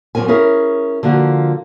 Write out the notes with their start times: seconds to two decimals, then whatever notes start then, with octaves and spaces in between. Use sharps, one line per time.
0.15 F#2 C#3 C4 A#4 G#5
0.28 C#4 E4 G#4 A#4
1.03 D3 F3 A#3 F4 F#4